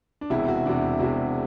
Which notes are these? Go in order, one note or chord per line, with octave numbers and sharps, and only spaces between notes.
D4
E1 E2 C3 E4
F#4
E1 E2 C3 D4
E4
E1 E2 C3 F#4